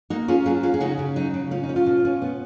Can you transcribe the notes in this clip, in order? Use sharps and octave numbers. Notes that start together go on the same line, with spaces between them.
A#3 D#4 F#4
C#4 F4 G#4
F#3 F4 G#4
C#4 F4 G#4
G#4
C#3 D#4 F#4
C#3
F#3 D#4
C#3
C#4 F4
D#4
C#4
F4
B2
C#4
B3